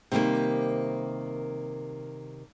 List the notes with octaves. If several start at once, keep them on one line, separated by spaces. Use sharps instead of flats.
C3 D#3 G3 G#3 A#3